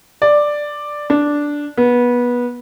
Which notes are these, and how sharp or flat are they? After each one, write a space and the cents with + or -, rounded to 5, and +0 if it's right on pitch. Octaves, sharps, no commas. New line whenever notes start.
D5 +5
D4 -5
B3 -20